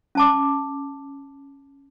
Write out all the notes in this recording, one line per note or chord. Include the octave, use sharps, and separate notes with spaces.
C#4 A5 D6